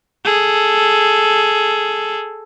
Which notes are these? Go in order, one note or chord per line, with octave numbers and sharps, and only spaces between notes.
G#4 A4